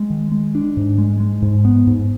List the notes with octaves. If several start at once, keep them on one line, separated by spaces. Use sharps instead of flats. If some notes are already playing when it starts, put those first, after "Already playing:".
Already playing: G#3
D#3
G#3
D4
G#2
G#3
G#3
G#2
B3
G#2